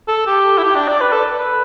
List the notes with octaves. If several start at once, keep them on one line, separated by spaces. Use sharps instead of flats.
A4
G4
E4
G4
D4
D5
B4
A4
B4